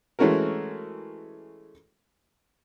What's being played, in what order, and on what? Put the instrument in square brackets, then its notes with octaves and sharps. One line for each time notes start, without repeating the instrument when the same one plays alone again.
[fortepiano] E3 G#3 A3 C#4 F#4 A#4